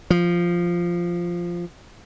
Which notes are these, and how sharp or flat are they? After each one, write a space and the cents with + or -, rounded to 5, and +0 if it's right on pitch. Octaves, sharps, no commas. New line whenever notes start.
F3 -5